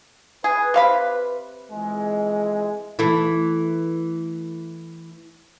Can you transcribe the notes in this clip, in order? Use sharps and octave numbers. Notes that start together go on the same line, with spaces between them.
G#4 B4
C3 F5 B5
F2 E3 G#3
E3 A3 E4